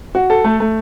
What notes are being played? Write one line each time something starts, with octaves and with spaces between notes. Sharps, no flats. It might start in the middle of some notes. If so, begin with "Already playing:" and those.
F#4
A4
A3
A3